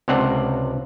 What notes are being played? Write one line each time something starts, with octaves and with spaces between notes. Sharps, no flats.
C#2 C3 C4 D4 F#5